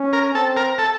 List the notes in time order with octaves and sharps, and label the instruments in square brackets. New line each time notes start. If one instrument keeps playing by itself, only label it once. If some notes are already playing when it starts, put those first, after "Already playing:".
Already playing: [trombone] C#4
[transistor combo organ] A#4
[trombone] C4 [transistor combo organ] A4
[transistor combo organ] A#4
A4